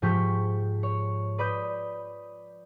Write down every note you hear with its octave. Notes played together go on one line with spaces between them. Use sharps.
G#2 F3 G4 C#6 G6 B6
C#5
B4 D5 B5 D#6 G6